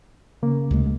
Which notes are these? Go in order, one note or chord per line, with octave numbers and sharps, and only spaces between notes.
C#3 A#3
D2 C3 G#3